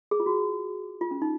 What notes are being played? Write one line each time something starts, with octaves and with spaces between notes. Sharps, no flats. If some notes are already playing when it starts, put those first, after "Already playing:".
G#4
F4
F#4
F4
C#4
D#4